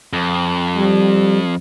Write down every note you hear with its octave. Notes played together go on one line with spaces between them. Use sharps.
F2
G3